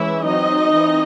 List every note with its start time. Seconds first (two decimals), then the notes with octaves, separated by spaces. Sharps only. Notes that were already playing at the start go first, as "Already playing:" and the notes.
Already playing: E3 G#3 C#4 E4 E5
0.25 F#3 C4 D#4 D#5
0.74 E3 C4